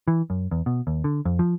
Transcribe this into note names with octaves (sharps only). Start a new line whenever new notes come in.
E3
F#2
E2
B2
D#2
D3
F2
F3